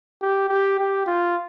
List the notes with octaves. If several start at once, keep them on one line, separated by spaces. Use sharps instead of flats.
G4
G4
G4
F4